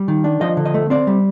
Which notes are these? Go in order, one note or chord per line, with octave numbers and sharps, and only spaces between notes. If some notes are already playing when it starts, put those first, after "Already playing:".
Already playing: G3
D#3
D4
F3 D#5
D3
D#5
A3
C4 D5
G3